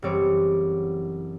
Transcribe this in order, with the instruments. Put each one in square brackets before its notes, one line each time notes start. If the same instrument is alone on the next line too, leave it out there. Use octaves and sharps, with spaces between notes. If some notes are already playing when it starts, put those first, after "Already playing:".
[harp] F#1 E3 G3 C4 C#5 D6